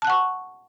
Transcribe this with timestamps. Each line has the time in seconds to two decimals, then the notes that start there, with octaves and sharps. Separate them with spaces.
0.02 A5
0.05 F#6
0.07 F#5
0.10 C#6